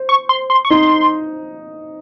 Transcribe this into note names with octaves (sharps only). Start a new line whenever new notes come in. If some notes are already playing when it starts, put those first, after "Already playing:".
Already playing: C5
C#6
C6
C6
C#6
D#4 C6